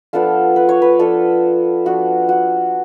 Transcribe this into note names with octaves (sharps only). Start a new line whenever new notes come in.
F3 B3 D4 F4 A4
B4
C#5
B4
F3 B3 D4 F4 A4
F3 B3 D4 F4 F#4
F#4